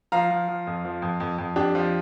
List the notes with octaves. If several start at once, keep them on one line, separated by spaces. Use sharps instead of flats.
F3 F5 A#5
F3
F3
F2
F3
F2
F2
F2
F2 D4 G4
F3